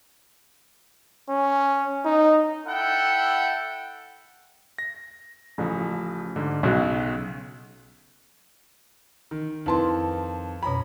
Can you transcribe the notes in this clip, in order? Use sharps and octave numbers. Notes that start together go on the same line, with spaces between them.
C#4
D#4
E4 A4 F#5 G5
A#6
A1 C#3 F3
G#2 D3
B1 C#3 F#4
D#3
F2 D#3 E4 B4 A5 C6
F2 B2 C#4 A#5 B5